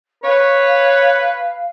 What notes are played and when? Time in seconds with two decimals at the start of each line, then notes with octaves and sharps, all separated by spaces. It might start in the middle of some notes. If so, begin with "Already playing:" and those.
0.24 B4 C#5 F5